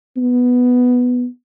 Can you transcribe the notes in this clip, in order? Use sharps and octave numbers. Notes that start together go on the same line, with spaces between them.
B3